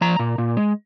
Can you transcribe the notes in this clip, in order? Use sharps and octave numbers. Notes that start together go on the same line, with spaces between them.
F3 A#5
A#2
A#2
G#3